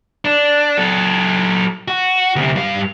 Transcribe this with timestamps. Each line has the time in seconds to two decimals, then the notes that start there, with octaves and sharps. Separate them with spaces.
0.25 D4
0.78 F#3 A4
1.88 F#4
2.36 D2 C3
2.56 G2 F5